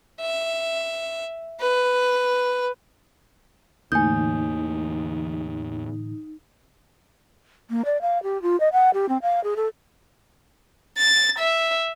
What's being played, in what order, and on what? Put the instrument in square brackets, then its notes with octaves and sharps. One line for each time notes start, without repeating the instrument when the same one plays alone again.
[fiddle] E5
B4
[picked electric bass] E2 A#3 [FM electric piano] A2 D3 E3 [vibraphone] D#4 [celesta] G#5 G6
[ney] A#3
D5
F5
G4
F4
D#5
F#5
G4
C4
F5
G#4
A4
[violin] A6
E5